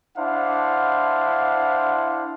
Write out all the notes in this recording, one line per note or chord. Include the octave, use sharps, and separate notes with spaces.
D4 E4 C5 F5 F#5